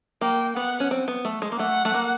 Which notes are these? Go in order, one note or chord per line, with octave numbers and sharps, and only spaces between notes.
A#3 G5
B3 F#5
C#4
C4
B3
A3
G#3
A#3
A3 F#5
A3
A#3